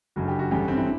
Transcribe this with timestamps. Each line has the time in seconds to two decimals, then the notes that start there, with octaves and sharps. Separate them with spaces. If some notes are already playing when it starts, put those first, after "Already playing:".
0.16 F#1 F#2 D3 F#4
0.28 G4
0.39 F#4
0.51 A1 G2 D3 G4
0.68 C4
0.77 E4